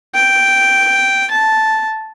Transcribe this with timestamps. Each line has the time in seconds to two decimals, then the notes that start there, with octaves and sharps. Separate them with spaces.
0.15 G5
1.31 A5